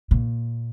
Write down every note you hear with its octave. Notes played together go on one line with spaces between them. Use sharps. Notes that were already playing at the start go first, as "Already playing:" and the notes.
A#2